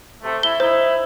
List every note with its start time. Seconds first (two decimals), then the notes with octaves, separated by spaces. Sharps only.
0.23 C3 A3
0.43 E4 G7
0.60 D#4 E4 C5